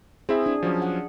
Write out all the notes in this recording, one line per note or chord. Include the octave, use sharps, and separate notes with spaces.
C4 E4 G#4 E5
D4
F3 F#3 C#4
F#5